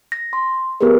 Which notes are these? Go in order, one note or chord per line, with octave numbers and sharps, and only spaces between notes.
A#6
C6
B3 G4 G#4 A#4 B4